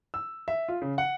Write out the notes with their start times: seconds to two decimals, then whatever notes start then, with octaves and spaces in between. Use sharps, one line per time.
0.14 E6
0.48 E5
0.68 F4
0.82 C#3
0.98 F#5